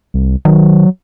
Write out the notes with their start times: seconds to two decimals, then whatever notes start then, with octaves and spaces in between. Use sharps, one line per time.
0.14 C2
0.45 D#3 F#3